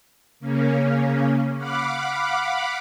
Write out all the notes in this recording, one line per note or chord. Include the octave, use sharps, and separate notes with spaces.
C#3 A#3 C#4
F5 F#5 B5 D6